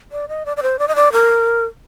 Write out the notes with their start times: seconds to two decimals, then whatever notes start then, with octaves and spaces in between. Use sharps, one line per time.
0.12 D5
0.29 D#5
0.46 D5
0.57 D5
0.63 C5
0.79 D5
0.88 D#5
0.96 D5
1.13 A#4